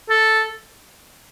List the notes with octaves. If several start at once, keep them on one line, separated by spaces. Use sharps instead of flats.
A4